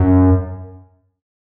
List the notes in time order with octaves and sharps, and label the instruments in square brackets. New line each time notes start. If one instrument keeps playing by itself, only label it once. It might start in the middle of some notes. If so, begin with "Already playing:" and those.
Already playing: [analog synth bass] F#2